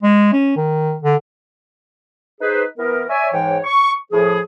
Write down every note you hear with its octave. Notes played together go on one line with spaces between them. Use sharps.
G#3
C#4
D#3
D3
D#4 G#4 B4 C5
E3 B3 A#4
C#5 D5 E5 G#5
G#2 E3 C#5 G5
C#6
A2 F3 G#4